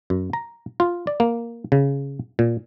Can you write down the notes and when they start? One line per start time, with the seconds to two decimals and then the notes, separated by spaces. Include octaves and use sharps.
0.10 F#2
0.33 A#5
0.80 F4
1.07 D5
1.20 A#3
1.72 C#3
2.39 A#2